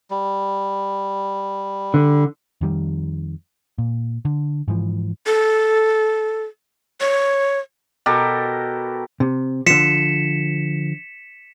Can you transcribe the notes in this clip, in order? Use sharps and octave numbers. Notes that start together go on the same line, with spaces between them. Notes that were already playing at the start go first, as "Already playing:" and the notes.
G3
D3
F2 D#3 G3
A#2
D3
G#2 E3 F3
A4
C#5
B2 G4 A4 A#4
C3
D3 F3 B6 C#7 E7